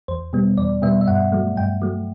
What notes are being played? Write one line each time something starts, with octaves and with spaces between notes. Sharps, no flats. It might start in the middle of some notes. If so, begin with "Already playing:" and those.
E2 C5
B2 G3 B3
E2 D5
B2 G3 B3 E5
E5
G2 F#5
F#3 A3
G2 G5
F#3 A3